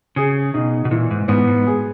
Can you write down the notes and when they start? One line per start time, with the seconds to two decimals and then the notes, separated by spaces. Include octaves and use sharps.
0.16 C#3 G#4
0.54 B2 D#4
0.85 B2
0.91 A#2 E3
1.11 G#2
1.28 G#2 B3
1.47 G#2
1.67 G#4